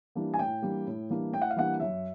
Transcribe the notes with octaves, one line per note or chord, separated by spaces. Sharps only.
E3 G3 A#3 D4
G#5
A2 G5
E3 G3 A#3 D4
A2
E3 G3 A#3 D4
A2 G5
F#5
F5
E3 G3 A#3 D4 F#5
F#2 E5